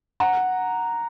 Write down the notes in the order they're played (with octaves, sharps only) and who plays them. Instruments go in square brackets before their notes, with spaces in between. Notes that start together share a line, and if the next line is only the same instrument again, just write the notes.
[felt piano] F#5 A#5